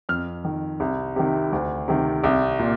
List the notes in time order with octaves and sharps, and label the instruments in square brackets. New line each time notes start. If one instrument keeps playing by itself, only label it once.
[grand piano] F2 F6
D#3
C2
C3 D#3
D2
C3 D#3
C2
A#2